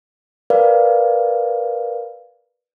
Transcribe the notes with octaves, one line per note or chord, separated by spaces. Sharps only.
A#4 B4 D5 F5